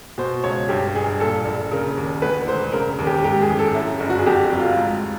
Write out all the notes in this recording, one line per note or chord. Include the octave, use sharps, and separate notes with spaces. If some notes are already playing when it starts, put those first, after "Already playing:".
B2 C5
C#2 C#5
G2 G4
G1 G#4
A#2 A4
A#1
C#3 A#4
D#2
D2 B4
E1 C5
C#3 A#4
D#2
G4
G#2 G4
G#4
A1
A4
F#2 E4
G1
F#4
G#4
F2 G4
F#4
F1
F4
G#2